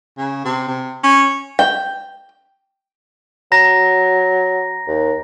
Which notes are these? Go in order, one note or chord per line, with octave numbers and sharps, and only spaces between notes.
C#3
C3
C3
C#4
G5
F#3 A#5 A#6
D#2